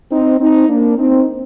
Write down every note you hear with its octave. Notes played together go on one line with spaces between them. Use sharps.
C4 D#4
C4 D#4
A#3 D4
C4 D#4